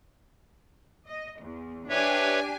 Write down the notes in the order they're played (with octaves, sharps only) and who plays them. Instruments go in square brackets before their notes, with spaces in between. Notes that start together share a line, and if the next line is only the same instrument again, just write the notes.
[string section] D#5
E2
[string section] D4 G4 G#5 [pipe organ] B4 C#5 E5